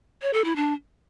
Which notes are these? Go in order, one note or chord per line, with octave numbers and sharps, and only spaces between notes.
C#5
A4
E4
D4